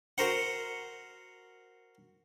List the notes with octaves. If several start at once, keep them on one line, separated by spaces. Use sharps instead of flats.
F#4 A#4 C5 F#5